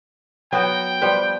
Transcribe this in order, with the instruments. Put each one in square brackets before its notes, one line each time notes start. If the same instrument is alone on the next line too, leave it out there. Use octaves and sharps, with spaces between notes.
[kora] F#3 B3 F#4 [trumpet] G5
[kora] F3 G3 B4